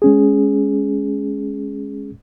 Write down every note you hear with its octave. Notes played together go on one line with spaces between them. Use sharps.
G#3 C#4 G#4